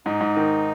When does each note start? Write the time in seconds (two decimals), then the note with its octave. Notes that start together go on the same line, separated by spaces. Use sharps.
0.06 G#2 D#4
0.21 G#2
0.36 D#3